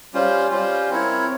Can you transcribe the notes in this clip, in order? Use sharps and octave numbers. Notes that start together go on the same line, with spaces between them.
G3 C#4 F4 C5
G3 C#4 F4 C5
C4 E4 A#4 C#5